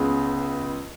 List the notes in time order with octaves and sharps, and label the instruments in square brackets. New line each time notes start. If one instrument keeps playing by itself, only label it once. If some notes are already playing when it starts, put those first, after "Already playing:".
Already playing: [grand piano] C#2 C#3 B3 G#4